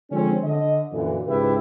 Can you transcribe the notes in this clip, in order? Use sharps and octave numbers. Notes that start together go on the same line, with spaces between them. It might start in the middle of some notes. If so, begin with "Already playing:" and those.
D3 F3 G#3 C4 C#4
D3 D#5
F#2 A#2 D3 E3
C#2 G#2 C#3 E4 G4 B4